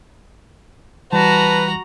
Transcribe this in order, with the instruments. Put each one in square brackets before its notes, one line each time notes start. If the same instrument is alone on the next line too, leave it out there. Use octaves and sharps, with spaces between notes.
[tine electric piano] E3 G3 [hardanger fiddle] F#4 A#5 [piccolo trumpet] B4 [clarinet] A5